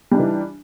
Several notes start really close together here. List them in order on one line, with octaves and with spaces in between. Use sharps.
G3 D4 D#4 E3